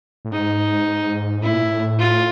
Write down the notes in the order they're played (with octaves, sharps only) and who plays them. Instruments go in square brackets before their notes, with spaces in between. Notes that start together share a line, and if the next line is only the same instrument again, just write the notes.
[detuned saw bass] A2
[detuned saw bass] G#2 [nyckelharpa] D#4
[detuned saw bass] A2 [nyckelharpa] E4
[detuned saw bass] A#2
A2
[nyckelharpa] F4